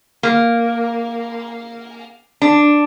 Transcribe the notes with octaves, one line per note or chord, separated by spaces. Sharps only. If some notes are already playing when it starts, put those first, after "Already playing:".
A#3
D4